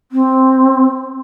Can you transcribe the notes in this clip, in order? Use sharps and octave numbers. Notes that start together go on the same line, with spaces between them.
C4